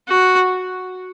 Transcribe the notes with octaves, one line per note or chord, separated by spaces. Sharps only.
F#4